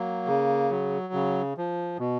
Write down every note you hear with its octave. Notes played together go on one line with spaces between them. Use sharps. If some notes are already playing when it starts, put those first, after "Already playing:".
Already playing: F#3 A#3
C#3
F#3
C#3
F3
B2